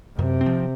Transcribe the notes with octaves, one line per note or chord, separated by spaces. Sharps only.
F#2 C3
C4
F3